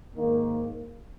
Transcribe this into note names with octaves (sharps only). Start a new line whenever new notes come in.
G#2 D#3 A#3